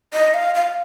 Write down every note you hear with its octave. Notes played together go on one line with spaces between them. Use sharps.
D#5
F5
F5